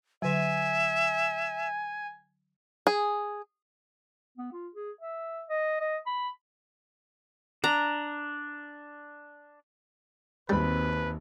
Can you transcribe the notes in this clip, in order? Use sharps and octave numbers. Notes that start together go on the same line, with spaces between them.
D3 F#3 E5 G#5
G#4
B3
F4
G#4
E5
D#5
D#5
B5
D4 A#5
G#1 D#2 G3 C4 B4 B5